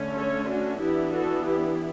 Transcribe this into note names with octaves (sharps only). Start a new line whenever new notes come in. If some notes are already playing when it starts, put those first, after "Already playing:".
Already playing: D3 A3 C#4
A4 C#5
D4 F#4
E3 B3 D4 E4 G4
F#4 A4
E4 G4